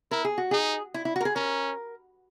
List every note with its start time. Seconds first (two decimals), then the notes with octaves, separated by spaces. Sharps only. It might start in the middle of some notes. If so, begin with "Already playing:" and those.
0.11 E4 A#4
0.25 G#4
0.38 F#4
0.51 D#4 G#4
0.94 E4
1.05 E4
1.16 F#4
1.21 A#4
1.25 G#4
1.35 C#4 A#4